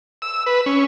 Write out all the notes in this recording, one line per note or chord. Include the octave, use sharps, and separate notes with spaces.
E6
B4
C#4